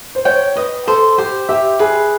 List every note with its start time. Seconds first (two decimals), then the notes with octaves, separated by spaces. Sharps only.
0.15 C5
0.25 C#5 G5
0.56 B4 D#5
0.87 A4 C5
1.18 G4 C5
1.49 G4 E5
1.79 G#4 B4